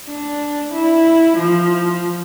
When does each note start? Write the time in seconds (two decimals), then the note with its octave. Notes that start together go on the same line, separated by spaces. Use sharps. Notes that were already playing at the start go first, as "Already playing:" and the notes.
0.08 D4
0.73 E4
1.37 F3